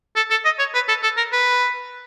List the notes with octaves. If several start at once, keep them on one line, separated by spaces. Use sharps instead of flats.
A4
A4
D#5
C#5
B4
A4
A4
A#4
B4